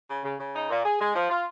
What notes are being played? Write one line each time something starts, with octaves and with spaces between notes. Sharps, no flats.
C#3
C#3
C#3
D#4
A#2
G#4
G#3
F3
F4